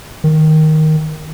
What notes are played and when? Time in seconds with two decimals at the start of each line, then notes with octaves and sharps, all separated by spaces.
0.24 D#3